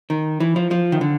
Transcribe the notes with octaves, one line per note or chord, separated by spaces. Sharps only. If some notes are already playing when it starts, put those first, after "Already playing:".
D#3
E3
F3
F3
D#3
D3